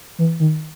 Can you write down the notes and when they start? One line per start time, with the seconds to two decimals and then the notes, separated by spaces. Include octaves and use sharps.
0.19 E3
0.40 D#3